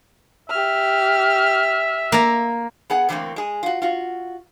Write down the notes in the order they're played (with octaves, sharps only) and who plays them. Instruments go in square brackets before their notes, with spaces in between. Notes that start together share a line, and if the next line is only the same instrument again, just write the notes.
[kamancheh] G4 F6 [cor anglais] E5
[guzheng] A#3 A#5
[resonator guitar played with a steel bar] B3 G#4 F#5
D3 E3 F#3 A3 A#3 C4
G#3 G#4
F4 F#4
F4 F#4